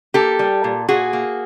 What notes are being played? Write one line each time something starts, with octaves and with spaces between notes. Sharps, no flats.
A#3 G4 A4
G3
A#2
A#2 F#4 G#4
A#3